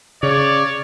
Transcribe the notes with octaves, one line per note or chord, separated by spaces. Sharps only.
C#3 C#5 D5